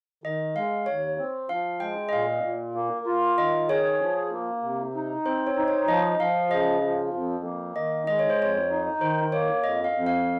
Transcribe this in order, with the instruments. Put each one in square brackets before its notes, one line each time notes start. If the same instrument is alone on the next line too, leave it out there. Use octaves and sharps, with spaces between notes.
[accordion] D#3 [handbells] D#5
[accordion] G#3 [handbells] F5
[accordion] D#2 [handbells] C#5
[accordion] C4
[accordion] F3 [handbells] F5
[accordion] G#3 [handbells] G5
[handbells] D#5
[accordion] A#2 [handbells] F5
[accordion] A#2
A#3
F4
[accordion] D#3 [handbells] D#5
[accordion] G#4 [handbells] C#5
[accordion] F3
A#3
C3
D#4
[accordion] C4 [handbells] C5
[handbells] C#5
[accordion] D#4
[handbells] C#5
[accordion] F3 [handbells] D#5
[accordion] F3 [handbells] F5
[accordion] C#3 [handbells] D#5
[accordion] F3
F2
A#3
[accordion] D#3 [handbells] D#5
[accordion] G#3 [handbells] D#5
[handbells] C#5
C5
[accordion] F2 [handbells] C#5
[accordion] D#4
[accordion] D#3 [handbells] C5
[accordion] A#3 [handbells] C#5
[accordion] F2 [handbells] D#5
[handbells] F5
[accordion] F2
[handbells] F5